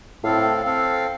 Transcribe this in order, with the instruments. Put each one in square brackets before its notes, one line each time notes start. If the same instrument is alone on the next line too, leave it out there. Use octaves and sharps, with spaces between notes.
[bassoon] A2 [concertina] C4 A4 F5
[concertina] C4 A4 F5